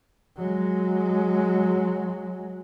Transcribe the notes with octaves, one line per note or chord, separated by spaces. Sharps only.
F#3 G#3